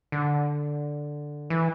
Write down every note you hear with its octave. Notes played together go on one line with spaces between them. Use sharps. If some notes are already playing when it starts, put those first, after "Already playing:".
D3
E3